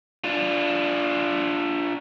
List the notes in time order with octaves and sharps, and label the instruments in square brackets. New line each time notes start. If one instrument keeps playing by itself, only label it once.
[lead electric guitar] D4 F4